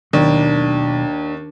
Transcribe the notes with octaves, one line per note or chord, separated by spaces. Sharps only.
D#2 B2 D#3 F#3 D4